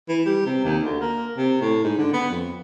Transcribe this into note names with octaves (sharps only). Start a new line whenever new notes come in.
E3
G3
C3
D#2
D2
A#3
C3
A2
G#2
D3
B3
F2